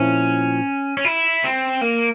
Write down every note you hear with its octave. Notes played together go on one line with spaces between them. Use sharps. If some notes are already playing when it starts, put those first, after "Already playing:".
Already playing: A#2 F3 C4 C#4 E4
C#4
E4
C4
A#3